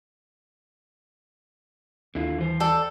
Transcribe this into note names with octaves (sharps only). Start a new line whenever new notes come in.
D#2 D3 E4 F4
E3 C5
A4 D5 G5